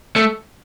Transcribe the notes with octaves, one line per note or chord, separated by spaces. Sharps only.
A3